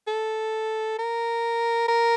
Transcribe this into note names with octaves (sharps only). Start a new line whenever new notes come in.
A4
A#4
A#4